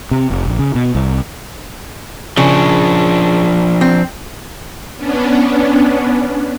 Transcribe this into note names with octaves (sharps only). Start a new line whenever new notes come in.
C3
F1
A#1
C#3
B2
C2
C#3 F3 D4
C4
B3 C#4 D4